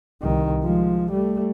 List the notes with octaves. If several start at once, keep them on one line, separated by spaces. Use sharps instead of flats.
C2 D#3
F3 G#3
G3 A3